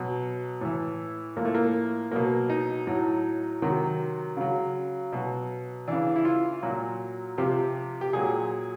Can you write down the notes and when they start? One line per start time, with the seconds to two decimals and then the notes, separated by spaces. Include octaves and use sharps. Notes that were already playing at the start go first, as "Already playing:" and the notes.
Already playing: B2 F#3
0.61 A2 E3
1.36 A2 F3 A#3
1.45 A3
1.55 A#3
2.11 B2 F#3 A#3
2.50 D#4
2.87 A2 F#3
3.62 C3 D#3 F#3
4.37 C#3 F#3
5.12 B2 F#3
5.88 C#3 E3 D4
6.16 E4
6.25 F4
6.62 A#2 F#3 F#4
7.38 C3 F3 G4
8.01 G4
8.13 A#2 F#3 G#4